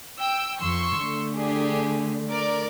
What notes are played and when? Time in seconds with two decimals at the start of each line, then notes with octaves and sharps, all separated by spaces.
0.18 G5 E6
0.61 F2 C6 C#6 E6
0.99 D3 A3
1.34 D4 G4 G#4
2.30 A#4 D5 D6